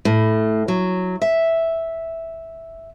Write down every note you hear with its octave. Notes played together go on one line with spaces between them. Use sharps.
A2
F#3
E5